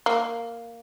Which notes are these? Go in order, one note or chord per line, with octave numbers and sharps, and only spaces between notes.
A#3